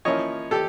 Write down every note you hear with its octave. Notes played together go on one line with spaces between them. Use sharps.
F3 A#3 C#4 E4 C#5 D#5
G4 A4